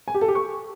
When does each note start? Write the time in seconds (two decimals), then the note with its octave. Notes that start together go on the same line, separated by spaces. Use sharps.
0.08 G#5
0.14 G4
0.21 A4
0.28 G4
0.35 C#6